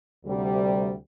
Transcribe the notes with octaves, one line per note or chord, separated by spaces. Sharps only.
D2 C3 G3